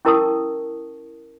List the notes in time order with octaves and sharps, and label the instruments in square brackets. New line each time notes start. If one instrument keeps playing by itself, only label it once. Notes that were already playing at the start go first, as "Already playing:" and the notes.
[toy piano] C#4 E4 A#4 A5 C#6 D#6